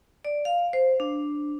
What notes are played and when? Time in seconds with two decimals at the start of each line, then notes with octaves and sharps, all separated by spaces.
0.25 D5
0.45 F5
0.73 C5
1.00 D4